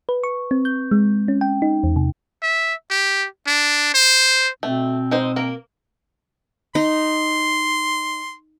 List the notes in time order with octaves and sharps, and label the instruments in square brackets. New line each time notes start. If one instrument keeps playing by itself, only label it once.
[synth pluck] B4
C#6
C4
G6
G#3
C#4
G5
D#4
E2
C3
[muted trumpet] E5
G4
D4
C5
[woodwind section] B2 C4 [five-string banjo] A3
[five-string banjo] G#3 D#4 C5
A#3 A#4
[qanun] D#4 [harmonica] C6